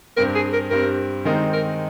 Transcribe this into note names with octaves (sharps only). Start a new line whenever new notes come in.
G2 G3 C4 A#4
G#4
A#4
G2 G3 C4 A#4
D#3 G#3 C4 D#4 A#4
A#4